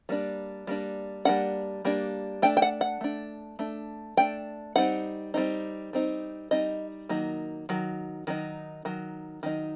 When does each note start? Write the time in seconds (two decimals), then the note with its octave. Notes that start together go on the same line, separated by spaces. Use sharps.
0.09 G3 A#3 D4
0.67 G3 A#3 D4
1.25 G3 A#3 D4 F#5
1.85 G3 A#3 D4
2.42 A3 D4 G5
2.57 G5
2.62 F#5
2.81 F#5
3.01 A3 D4
3.59 A3 D4
4.17 A3 D4 G5
4.76 G3 C4 D#4 F#5
5.34 G3 C4 D#4
5.93 G3 C4 D#4
6.51 G3 C4 D#4 D#5
7.09 D#3 F#3 A#3 D#4
7.69 D#3 F#3
8.27 D#3 F#3 D#4
8.85 D#3 F#3
9.43 D#3 F#3 D#4